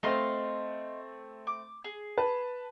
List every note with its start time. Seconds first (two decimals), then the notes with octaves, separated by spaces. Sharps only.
0.03 A3 C4 D#5 F5 C6
1.47 D6
1.84 G#4
2.18 B4 A5